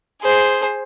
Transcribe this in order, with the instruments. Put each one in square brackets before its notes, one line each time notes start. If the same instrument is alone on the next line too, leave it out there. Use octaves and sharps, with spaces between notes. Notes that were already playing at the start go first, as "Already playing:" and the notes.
[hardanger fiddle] G#4 C5